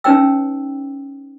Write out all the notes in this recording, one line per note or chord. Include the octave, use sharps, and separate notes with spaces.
C#4 D#4 B4 C#5 G5 E6